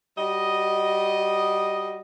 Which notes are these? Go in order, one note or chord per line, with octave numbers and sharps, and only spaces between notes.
G3 F#4 D#5